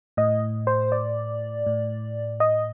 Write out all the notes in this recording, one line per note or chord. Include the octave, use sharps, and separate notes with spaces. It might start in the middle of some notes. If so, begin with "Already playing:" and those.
A2 D#5
C5
D5
A2
D#5